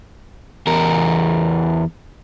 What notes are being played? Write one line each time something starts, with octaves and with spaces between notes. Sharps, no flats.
E2 A#4